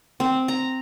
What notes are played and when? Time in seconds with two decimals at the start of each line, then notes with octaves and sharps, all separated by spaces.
0.20 C4
0.48 A#5